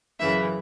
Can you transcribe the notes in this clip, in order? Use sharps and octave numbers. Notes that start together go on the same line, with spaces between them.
F#2 C#3 E3 E5